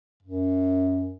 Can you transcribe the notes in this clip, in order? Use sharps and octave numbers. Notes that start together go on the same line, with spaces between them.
F#2